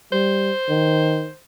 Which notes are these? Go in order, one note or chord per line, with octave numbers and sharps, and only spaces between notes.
G3 C5
D#3